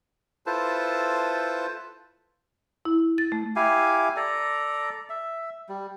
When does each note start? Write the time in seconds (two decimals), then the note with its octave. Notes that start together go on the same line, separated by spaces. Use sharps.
0.46 E4 F4 A4 B4 C5 A5
2.85 E4
3.18 A6
3.32 A3
3.56 E4 G4 F5 G#5
4.16 A4 D5 A#5
5.10 E5
5.69 G3